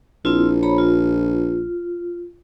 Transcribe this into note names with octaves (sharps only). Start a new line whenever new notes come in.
A#1 C4 E4 F4
C#5 A#5 B5
F4